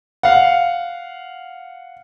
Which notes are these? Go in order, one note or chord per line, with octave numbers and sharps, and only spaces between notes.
F5 F#5